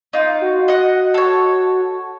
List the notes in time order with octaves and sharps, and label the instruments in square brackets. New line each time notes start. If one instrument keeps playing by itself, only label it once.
[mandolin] D#4 F4
[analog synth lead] F#4
[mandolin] D#5 F#5
A4 C#5